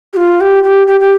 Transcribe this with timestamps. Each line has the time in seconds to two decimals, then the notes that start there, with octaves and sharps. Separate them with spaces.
0.13 G4
0.17 F4
0.41 G4
0.64 G4
0.87 G4
1.00 G4